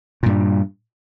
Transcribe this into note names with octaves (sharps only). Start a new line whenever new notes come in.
G2 A#2 G3